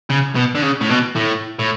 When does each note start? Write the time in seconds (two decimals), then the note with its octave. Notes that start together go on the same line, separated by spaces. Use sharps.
0.10 C#3
0.36 B2
0.55 D3
0.63 C#3
0.81 A2
0.90 B2
1.16 A2
1.59 A2